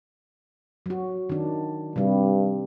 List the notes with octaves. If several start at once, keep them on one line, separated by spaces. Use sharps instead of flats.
F#3 F#4
D#3 D4
G2 C3 G3